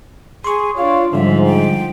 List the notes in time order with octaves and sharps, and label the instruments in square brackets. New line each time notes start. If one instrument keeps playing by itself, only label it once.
[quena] G#4 [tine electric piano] C6 C#6
[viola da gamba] D4 [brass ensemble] F4 C#5 [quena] F5
[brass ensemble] G#2 [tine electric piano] D3 G3 [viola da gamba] F3 [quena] E5
[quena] G5